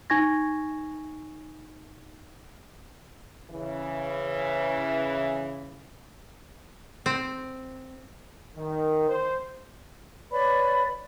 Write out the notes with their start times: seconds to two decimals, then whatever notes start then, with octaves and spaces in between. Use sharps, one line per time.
0.10 D#4 G#5 C#6 G#6 A#6
3.50 C#3 E3
7.06 C4
8.57 D#3
9.09 C5
10.32 B4 C#5 D5 B5